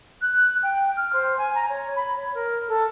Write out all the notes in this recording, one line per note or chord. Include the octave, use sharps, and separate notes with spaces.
F#6
G5
F6
C5
G#5
A#5
C#5
B5
C#5
A#4
A4